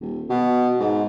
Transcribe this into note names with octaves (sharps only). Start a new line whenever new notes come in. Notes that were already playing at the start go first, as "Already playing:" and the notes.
D#1
B2
G#2